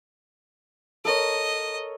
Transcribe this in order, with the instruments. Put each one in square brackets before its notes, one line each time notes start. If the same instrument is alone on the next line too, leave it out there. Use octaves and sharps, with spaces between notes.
[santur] A4 A#4 C#5 [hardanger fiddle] D#5